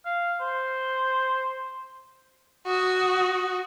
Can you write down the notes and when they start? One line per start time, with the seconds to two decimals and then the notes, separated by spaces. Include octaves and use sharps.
0.06 F5
0.40 C5
2.67 F#4 D#6